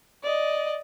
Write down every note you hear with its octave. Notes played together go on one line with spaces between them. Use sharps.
D5 D#5